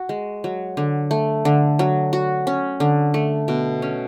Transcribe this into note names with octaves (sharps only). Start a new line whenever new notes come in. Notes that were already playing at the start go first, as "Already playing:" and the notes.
Already playing: F#4
G#3
F#3
D3
A3
D3
F#3
F#4
C#4
D3
A3
B2
C#4